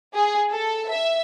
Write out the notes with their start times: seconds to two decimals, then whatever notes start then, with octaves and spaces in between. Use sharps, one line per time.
0.16 G#4
0.52 A4
0.89 E5